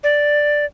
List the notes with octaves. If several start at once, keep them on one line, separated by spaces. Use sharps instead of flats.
D5